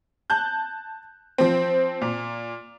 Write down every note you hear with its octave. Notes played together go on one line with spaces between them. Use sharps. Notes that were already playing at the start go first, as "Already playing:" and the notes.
A5 F#6 G6
F3 C4
A#2